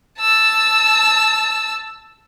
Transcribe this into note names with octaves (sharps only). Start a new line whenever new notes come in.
A5 E6